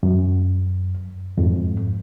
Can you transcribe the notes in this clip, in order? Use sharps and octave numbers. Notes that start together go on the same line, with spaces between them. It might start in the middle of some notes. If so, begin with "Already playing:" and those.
F#2
F2 G#2